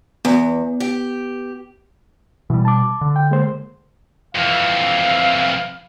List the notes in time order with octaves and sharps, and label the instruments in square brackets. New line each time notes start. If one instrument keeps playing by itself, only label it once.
[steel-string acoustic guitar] E2 [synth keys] B3
[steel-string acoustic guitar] G4
[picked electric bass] B2 G3 [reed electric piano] E3
[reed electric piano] A5 D6
[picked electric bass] D3
[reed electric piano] G5
G#3 A#3 C5
[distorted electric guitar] F2 E3 [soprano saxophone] F5